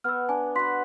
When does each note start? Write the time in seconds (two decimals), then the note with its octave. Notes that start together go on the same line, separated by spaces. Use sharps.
0.04 B3 E6 F6
0.29 D4 G#5
0.56 F#4 B4 C6 B6